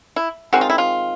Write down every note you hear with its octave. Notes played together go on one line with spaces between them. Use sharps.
E4
D#3 G#3 C4 F#4
F4
E4
F4